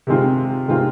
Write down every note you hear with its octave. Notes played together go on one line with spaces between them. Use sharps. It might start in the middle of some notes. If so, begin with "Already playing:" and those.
C3 D#3 G#3 C4 F4
C3 D#3 G#3 C4 F4